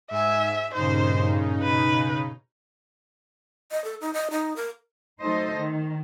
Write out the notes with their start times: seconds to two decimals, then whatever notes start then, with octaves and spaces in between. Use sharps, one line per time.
0.11 G#2 E5 G#5
0.74 G2 A#2 C#3 D#4 C5
1.62 B2 B4
3.71 D#5
3.84 A4
4.01 D#4
4.13 D#5
4.31 D#4
4.56 A#4
5.21 F#3 A3 D#4 A4 C5 D#5
5.58 D#3